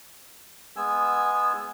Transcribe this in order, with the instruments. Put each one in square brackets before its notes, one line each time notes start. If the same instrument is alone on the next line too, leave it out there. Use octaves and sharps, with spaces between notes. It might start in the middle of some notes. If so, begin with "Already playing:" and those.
[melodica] G#3 B3 G#5 E6